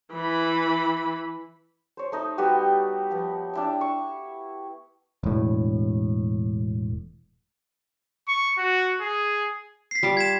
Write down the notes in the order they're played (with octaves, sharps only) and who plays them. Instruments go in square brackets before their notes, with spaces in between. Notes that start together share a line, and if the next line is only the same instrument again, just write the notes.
[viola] E3 B5
[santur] C5 C#5
A3 D#4 D#5
G3 B3 F#4 G4
F3 B3
D4 E4 G5
C#6
[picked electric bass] E1 A2
[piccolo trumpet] C#6
F#4
G#4
[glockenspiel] B6 C7
[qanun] G3 F4 D6
[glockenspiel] G#6 B6 E7